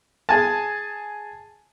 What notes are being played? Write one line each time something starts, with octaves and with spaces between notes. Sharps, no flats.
G#4 G#5 A5